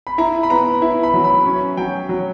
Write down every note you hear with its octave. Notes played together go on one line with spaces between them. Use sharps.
B5
E4 A#5
B5
B3 A#5
E4
B5
F#3
B5
C#4
F#3 G5
F#3